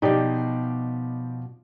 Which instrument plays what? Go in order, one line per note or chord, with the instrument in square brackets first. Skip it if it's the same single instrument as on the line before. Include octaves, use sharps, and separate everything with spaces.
[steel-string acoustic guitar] B2 F3 [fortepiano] D#4 G4 D5